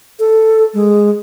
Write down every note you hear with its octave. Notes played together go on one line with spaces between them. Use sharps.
A4
G#3